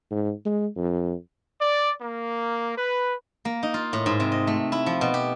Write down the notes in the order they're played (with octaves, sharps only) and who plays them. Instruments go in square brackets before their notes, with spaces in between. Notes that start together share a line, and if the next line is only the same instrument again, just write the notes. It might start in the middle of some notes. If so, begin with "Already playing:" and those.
[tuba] G#2
G#3
F2
[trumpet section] D5
A#3
B4
[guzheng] A#3
D#4
F4
A2
G#2
C3
D#5
A3
E4
F3
B2
G4